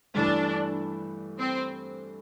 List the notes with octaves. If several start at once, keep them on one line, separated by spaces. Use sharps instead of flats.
G2 E3 A3 D4
C4